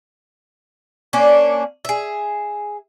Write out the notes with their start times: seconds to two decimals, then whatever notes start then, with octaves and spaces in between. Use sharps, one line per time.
1.13 A#3 C#4 D4
1.85 G#4 E5